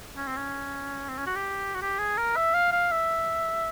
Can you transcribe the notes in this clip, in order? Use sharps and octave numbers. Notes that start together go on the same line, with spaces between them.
C#4
C4
C#4
C4
C#4
F#4
G4
F#4
G4
G#4
A#4
E5
F5
F5
E5